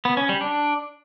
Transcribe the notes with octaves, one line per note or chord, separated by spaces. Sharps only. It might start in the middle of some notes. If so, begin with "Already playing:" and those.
B3
C#4
G3
D4